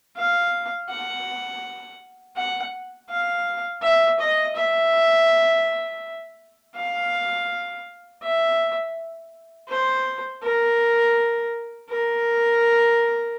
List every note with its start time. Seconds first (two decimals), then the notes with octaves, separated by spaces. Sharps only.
0.17 F5
0.90 F#5
2.37 F#5
3.09 F5
3.82 E5
4.20 D#5
4.56 E5
6.76 F5
8.23 E5
9.69 C5
10.43 A#4
11.90 A#4